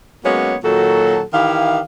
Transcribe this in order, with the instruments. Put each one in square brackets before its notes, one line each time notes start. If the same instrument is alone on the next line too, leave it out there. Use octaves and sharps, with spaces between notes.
[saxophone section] F#3 G#3 A#3 B3 C#4 C#5
A#2 D#3 F#3 F#4 A4
D#3 E3 E4 G4 F5